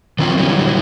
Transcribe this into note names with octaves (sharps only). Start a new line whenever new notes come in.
D#3 F#3 C4 F4
D3 E3 F#3 G3